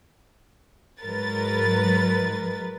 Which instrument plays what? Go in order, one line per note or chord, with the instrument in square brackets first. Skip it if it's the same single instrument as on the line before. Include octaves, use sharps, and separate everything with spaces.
[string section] G#2 F#3 G#3 A#4 B4 A6